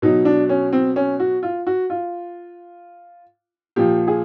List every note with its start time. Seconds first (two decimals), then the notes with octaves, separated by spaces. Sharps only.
0.02 B2 F#3 D#4
0.25 D4
0.49 C#4
0.73 C4
0.96 C#4
1.20 F#4
1.43 F4
1.67 F#4
1.90 F4
3.76 A#2 F3 G4
4.07 G#4